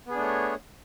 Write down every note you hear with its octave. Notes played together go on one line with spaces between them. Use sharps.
A3 B3 D4 G#4 C#5